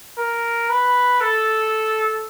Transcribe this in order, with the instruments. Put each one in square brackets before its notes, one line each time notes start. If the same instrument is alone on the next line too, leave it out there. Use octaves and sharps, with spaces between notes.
[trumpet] A#4
B4
A4